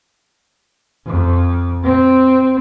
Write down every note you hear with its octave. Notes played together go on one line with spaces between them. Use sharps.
F2
C4